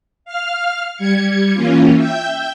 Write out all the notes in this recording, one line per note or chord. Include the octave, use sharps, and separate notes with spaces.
F5 F6
G3 G#6 C#7
E3 A#3 C#4 F4
E5 G5 G6